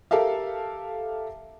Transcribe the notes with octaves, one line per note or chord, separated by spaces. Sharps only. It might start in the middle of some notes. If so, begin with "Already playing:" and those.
G4 A4 A#4 E5 F5